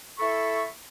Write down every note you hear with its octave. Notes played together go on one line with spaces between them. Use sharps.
E4 A4 B5 C#6